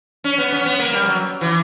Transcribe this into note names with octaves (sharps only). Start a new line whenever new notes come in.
C#4
B3
C#4
B3
A#3
G3
F#3
E3